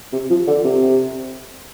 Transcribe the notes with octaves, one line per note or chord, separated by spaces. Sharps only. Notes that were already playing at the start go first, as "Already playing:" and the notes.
C3
F3
D3
C3